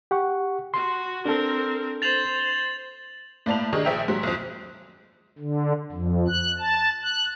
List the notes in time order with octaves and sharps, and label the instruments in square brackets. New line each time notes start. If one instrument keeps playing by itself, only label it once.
[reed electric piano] G4 F#5 C#6
[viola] F#4 [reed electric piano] C6
[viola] C4 A#4 [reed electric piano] D4 A4
[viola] C5 [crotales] A6 F7 F#7
[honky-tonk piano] A2 A#3 D5 A5 F7
D#3 D4 G#4 D#5 A#5 C#6
A#1 G#4 E5 G5 F7
G#2 F#3 B6
B1 F2
[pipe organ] D3
F2
F#6
A5
F#6